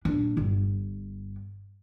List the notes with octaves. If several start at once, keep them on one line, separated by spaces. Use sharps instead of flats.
A#1 D4
G1